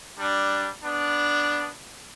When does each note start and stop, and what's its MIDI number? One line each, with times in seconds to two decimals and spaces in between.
0.19 0.67 55
0.19 0.67 62
0.84 1.68 59
0.84 1.68 62